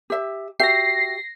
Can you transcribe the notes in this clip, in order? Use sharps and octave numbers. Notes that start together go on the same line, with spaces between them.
G4 E5
F#4 G4 E5 A#6 C7